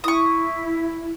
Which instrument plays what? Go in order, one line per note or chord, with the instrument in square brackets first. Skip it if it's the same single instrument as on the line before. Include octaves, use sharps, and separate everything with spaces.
[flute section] E4 [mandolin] C#6 D#6